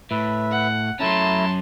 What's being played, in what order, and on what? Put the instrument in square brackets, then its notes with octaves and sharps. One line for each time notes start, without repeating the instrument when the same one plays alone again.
[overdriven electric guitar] A2 [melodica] B4 E5
[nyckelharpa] F#5
[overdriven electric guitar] F#3 C#4 [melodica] A3 E4 A#5 [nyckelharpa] A5 C6